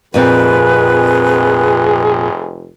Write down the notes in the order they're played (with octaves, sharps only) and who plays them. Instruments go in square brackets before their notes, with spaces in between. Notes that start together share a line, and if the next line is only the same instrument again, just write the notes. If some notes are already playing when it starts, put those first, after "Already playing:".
[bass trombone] F1 [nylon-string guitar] F2 A#2 C4 [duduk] G#4 [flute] B4